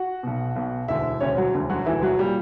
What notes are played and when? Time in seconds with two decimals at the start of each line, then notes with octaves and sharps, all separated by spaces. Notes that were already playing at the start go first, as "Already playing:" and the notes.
Already playing: F#4 F#5
0.23 B1 B2
0.56 B1 B2
0.88 E1 D2 D3 E4 E5
1.20 E1 D2 D3 C#4 C#5
1.37 F#3 F#4
1.54 E1 D2 D3
1.70 F#3 F#4
1.86 E1 D2 D3 E3 E4
2.03 F#3 F#4
2.19 A#2 G3 G4